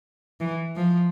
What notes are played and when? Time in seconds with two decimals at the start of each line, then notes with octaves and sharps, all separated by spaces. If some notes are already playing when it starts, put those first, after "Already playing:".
0.40 E3
0.76 F3